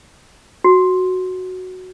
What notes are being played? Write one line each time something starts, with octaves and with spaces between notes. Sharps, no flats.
F#4